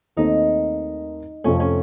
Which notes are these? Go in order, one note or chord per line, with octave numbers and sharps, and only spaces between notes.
D#2 D#3 A3 C4 D#4
F2 C3 F3 A3 C#4
C#4